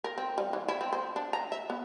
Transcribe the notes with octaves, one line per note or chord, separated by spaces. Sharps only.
A#4
C4
G3
E3
E4
C4
C5
D4
A#5
E5
B3